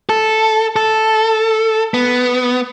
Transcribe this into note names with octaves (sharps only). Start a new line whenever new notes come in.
A4
A4
B3